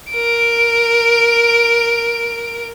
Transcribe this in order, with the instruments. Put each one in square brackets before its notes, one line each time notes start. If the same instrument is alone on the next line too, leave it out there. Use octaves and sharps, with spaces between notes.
[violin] A#4 D7